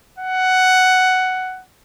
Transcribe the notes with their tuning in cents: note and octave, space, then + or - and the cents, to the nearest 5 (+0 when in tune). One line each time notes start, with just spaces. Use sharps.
F#5 +10